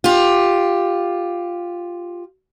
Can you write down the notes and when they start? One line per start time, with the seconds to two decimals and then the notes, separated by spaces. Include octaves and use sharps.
0.04 F4 G4